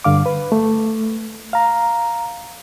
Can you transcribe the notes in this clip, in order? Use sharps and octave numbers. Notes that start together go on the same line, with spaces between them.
G2 D3 F5 D6
B4
A3
F5 A#5